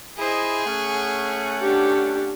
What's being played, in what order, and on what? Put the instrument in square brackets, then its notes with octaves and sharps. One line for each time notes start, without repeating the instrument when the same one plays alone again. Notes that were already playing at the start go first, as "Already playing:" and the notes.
[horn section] E4 C5 D#5 [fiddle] G#4
[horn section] A3 C#4 F#5
[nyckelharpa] D4 G4